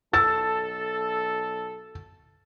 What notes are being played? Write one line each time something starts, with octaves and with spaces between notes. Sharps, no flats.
B1 A4 E6 A6